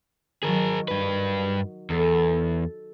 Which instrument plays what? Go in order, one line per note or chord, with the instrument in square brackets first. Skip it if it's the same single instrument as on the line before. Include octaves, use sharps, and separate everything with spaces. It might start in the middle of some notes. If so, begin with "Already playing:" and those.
[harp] D#3 F#3 [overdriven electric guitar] G#4 A#4
[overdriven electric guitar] G2 B4
[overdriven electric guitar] E2 [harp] A4